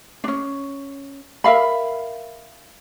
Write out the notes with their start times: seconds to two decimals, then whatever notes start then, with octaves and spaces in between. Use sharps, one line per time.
0.24 C#4 D4
1.44 A#4 E5 F5 B5